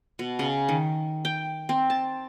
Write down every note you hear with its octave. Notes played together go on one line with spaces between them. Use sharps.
B2
C#3
D#3
G5
C4
A5